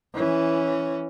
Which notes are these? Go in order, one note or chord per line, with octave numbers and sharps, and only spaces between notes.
E3 C#4